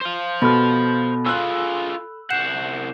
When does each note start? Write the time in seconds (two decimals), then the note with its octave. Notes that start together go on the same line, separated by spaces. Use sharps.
0.01 C5 F5
0.42 B2 A4 B5 F6
1.26 F4 G#4 E6 F#6
2.31 C2 F#5 G6 C7 E7